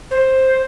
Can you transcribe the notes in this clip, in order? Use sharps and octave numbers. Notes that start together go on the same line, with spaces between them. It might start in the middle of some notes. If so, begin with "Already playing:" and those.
C5